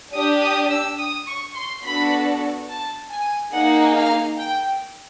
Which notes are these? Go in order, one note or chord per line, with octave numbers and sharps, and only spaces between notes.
D4 G4 D#6
D#6
E6
D#6
C#6
C6
B3 D4 F#4 A4 B5
A5
G#5
A#3 D#4 G#4 F#5
F5
G5